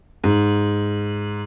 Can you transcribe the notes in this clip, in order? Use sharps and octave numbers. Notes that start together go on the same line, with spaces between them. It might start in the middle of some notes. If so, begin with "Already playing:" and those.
G#2